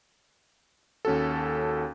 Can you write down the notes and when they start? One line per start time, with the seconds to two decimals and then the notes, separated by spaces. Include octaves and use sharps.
1.05 D#2 C#4 F#4 A4